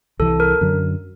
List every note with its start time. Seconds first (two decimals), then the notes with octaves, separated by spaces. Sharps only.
0.20 C2 C3 E3 A4
0.40 A#4
0.61 F#2 D3 F#3